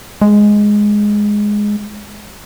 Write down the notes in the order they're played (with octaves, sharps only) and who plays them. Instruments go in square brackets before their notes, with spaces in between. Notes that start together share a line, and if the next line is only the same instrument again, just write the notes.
[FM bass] G#3